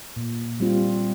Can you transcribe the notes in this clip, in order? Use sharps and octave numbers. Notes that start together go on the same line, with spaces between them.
A#2
G3 C4 F4